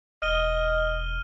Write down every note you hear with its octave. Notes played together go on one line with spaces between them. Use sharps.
E1 D#5 F6 D#7 G7